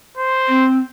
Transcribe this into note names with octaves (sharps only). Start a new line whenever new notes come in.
C5
C4